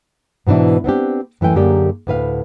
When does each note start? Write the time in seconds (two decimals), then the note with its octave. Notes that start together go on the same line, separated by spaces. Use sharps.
0.47 G#2 B2 E3 D4 E4
0.84 B3 C4 D4 G4
1.41 F#2 E3 A3 G5 G#5
1.55 F#2 D3 A#3 G4 G#4 D5
2.07 D2 A2 B4 F5